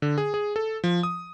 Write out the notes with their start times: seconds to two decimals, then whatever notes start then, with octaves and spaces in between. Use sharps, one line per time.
0.02 D3
0.18 G#4
0.34 G#4
0.56 A4
0.84 F3
1.03 D#6